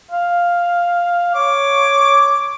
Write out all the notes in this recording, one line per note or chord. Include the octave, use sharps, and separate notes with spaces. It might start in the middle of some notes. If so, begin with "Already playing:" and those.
F5
C#5 D6